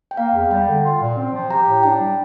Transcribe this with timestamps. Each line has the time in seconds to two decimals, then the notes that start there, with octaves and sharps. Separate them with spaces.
0.11 G5
0.17 A#3 F5
0.34 E2
0.50 G3 G5
0.68 D3
0.84 F4
1.01 A#2
1.17 C4
1.33 F3
1.50 G4 A#5
1.66 A2
1.83 D4 G5
2.00 G3